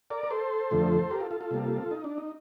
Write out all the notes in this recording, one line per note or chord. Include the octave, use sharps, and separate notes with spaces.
A#4 D5
A#4
A4 C5
F2 D3 F3 A3
G4 A#4
F4 A4
F4 A4
F4 A4
C3 G3 A#3
D#4
D4
D#4